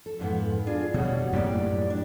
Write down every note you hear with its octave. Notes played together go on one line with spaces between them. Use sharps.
A4
F2 G#2 B3
D4 F4 G#4
B2 G3 C#5 F#5
F#2 A2 A#3 G4 D5
D4